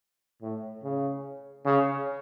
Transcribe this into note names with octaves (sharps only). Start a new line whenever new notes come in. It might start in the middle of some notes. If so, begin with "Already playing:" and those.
A2
C#3
C#3